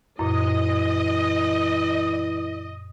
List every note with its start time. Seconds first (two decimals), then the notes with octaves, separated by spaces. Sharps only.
0.19 F#2 A#2 E3 D#5